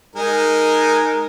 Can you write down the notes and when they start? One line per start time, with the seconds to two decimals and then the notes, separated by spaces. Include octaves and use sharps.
0.16 G#3 D#4 A#4